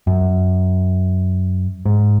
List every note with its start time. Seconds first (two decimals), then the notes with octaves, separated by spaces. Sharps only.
0.07 F#2
1.86 G#2